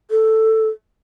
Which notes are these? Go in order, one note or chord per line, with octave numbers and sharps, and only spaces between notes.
A4